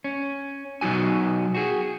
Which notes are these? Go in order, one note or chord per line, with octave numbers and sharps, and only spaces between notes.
C#4
B2 F#3 D#4 F#4 G#5
F#4 G#4